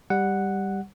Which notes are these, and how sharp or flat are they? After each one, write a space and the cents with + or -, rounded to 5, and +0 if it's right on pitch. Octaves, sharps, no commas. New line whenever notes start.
G3 +5 F#5 +0